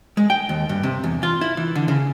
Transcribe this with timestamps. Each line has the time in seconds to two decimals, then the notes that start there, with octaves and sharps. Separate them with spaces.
0.17 G#3
0.30 G5
0.49 D#2
0.69 G2
0.83 C3
1.04 E2
1.23 F4
1.41 E4
1.57 E3
1.75 D3
1.88 C#3